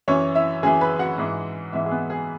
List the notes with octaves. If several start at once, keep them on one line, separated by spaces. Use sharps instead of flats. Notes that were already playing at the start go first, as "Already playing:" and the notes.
F#2 E3 C#4 C#5
E4 E5
F#2 E3 G#4 G#5
B4 B5
F#4 F#5
G#2 E3
G#2 E3 E4 E5
G#4
B3 B4
G#4